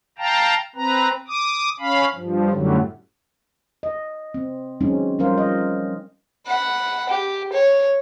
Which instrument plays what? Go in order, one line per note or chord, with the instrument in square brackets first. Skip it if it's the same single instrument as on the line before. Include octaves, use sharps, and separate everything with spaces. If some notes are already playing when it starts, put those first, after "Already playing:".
[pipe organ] F5 G5 A5 A#5
C4 B4 A#5
D6 D#6
C#4 F5 B5
G2 F3
F#2 A2 D3 F#3 G3
[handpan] D#5
C4
F#3 G#3 C4 C#4 D#4
F3 G3 C#4 A#4 C5 F5
D#5
[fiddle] F#5 B5
G4
C#5